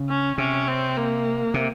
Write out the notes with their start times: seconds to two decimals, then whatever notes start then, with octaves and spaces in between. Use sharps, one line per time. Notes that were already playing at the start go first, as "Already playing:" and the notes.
Already playing: C#3
0.09 C#4
0.38 C3 C#4
0.67 C4
0.96 A#3
1.54 C3